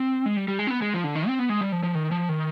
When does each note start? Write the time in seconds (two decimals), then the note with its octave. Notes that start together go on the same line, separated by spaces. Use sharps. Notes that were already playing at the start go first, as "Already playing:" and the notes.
Already playing: C4
0.26 G#3
0.37 G3
0.48 G3
0.59 G#3
0.67 C4
0.71 B3
0.82 G#3
0.94 F3
1.04 D3
1.15 D#3
1.27 C4
1.39 B3
1.49 G#3
1.61 G3
1.72 F3
1.83 F3
1.95 D#3
2.11 F3
2.29 D#3